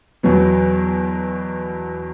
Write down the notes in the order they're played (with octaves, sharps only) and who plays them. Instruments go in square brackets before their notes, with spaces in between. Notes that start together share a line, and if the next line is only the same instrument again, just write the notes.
[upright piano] E2 B2 F#3 B3